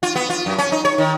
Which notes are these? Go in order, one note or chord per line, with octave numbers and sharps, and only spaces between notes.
F4
B3
F4
F#2
C#4
D#4
C#5
D#3